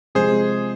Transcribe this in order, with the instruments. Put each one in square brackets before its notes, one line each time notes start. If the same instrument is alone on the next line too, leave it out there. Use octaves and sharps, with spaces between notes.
[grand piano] C3 F3 G#3 [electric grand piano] G#4 C5